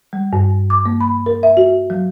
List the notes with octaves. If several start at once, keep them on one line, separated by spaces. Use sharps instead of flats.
G3
G2
D6
A#3
B5
A#4
E5
F#4
F#3